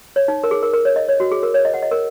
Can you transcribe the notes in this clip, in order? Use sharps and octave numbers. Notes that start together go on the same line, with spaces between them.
C#5
D#4
A#4
G#4
A#4
A#4
C#5
D#5
C#5
F#4
G#4
A#4
C#5
D#5
F#5
D#5
A#4